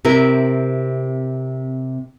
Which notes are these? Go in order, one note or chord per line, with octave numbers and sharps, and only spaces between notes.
C3 C4 E4 A#4